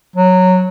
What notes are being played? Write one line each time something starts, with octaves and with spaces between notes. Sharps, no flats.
F#3